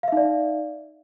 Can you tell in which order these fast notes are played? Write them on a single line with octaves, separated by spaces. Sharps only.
F5 E5 D#4 D5